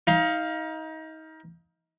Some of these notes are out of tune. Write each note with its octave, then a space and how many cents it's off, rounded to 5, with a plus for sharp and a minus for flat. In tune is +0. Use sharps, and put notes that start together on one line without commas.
D#4 +30 F5 +0